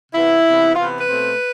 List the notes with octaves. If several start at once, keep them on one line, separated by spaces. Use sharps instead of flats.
C3 E3 B3 E4
C3 E3 B3
C3 E3 B3 F4
B4
B2 A3 C4